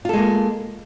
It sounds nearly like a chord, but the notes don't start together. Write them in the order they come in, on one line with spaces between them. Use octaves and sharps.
F4 A4 G#3 A#3